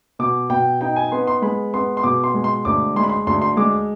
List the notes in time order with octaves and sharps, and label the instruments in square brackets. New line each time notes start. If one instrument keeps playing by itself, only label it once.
[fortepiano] B2 D6
B2 G5
D#4 G5
G#5
B3 C6
C6
G#3 B5
B3 C6
C6
B2 D6
C6
G#3
C6
D2 D6
G#3 C6
B5
C6
D2 C6
C6
G#3 D6